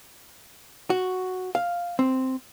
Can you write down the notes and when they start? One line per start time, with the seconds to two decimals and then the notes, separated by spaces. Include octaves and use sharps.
0.90 F#4
1.55 F5
1.99 C4